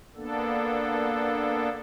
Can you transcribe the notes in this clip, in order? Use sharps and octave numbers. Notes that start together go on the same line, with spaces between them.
A#3 B3 D4 A4